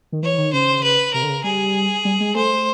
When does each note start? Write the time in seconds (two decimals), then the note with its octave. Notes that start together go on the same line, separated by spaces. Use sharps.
0.12 D#3
0.23 E3 C#5
0.33 E3
0.38 D#3
0.53 C#3 C5
0.83 B4
1.13 C3 A#4
1.23 D3
1.29 C#3
1.44 G3 G#4
2.05 G3
2.20 G#3
2.35 A3 C5